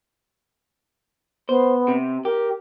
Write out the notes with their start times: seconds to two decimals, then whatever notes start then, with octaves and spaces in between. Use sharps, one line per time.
1.49 B3 C5
1.88 C3
2.25 G4 A#4